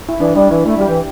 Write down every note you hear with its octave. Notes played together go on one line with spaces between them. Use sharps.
E4
E3 D4
G3 D4
E3 E4
A3 E4
G3 G4
E3